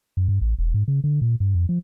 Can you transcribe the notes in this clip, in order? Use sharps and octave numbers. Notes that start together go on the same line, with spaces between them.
F#2
G2
A1
E1
G#2
C#3
D3
A#2
G2
F2
F3